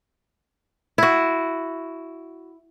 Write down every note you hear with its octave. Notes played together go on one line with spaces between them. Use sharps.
E4 F#4